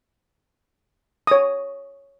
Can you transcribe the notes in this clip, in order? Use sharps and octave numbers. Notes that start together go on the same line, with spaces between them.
C#5 D#6